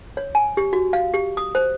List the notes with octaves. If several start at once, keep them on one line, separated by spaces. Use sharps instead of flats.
C#5
G#5
G4
F#4
F5
G4
D#6
C5